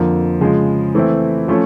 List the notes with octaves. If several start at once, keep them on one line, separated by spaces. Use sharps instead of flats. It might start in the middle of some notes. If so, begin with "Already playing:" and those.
Already playing: F2 D3 F3 A#3
C#3 F3 G#3
E3 A3 C4 E4
F3 A3 C#4